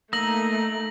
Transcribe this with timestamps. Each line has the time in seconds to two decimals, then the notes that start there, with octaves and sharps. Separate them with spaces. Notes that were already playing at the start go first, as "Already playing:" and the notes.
0.13 A3 A#3 D#4 A#5 E6 A#6 F#7